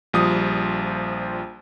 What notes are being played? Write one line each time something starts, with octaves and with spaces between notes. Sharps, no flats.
A#1 F3 G3 D#6